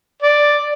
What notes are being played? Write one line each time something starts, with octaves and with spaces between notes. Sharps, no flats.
D5